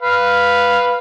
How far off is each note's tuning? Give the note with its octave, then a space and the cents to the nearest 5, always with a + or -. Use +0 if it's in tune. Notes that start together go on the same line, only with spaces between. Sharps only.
B4 +0 F5 +0